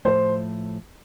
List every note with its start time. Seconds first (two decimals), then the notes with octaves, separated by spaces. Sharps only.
0.05 A2 F3 A3 C5